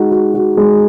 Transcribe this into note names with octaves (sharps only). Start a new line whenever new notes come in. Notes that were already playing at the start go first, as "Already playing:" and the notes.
Already playing: G#3 D#4 F#4
F#4
F#4
G#3